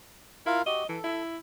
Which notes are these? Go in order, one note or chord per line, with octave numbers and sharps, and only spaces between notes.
E4 F4 A#4 F5
F#4 G4 D#5
E3 A4
E4